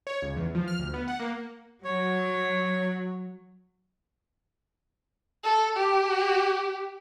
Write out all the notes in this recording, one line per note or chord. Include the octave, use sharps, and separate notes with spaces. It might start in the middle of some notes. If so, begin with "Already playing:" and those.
C#5
C#2
E2
F3
F6
D2
B3
F#5
A#3
F#3 C#5
A4
G4